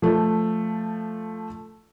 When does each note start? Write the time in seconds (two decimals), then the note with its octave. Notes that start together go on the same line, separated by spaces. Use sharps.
0.02 F3 A3